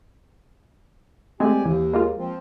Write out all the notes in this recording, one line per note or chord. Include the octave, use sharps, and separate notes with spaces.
G#3 A3 C4 G4 D5 G#5
D#2 E3
G#3 A#3 F4
F3 C4